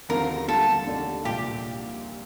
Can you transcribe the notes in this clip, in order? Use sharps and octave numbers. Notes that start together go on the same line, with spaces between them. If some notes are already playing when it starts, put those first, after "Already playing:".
D#2 D3 F3 C4 F4 A#4
D3 G3 A#3 F4 A4
D#2 D3 A3 D4
C2 A#2 F3 A#3 F4 G4